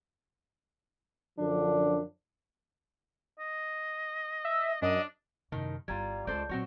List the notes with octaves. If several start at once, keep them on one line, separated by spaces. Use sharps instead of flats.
F#2 D3 F3 D4
D#5
E5
F#2 D4 D#5
F#2 A2 C3 D#3
G1 G3 E4 F4 A#5 G#6
C#2 C#3 A4 C5 D5 G6
A#2 F#3 C4 F#4 C#5